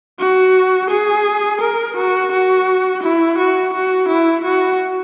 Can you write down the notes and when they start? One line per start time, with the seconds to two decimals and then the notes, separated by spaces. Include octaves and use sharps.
0.20 F#4
0.90 G#4
1.61 A#4
1.96 F#4
2.32 F#4
3.03 E4
3.38 F#4
3.74 F#4
4.08 E4
4.44 F#4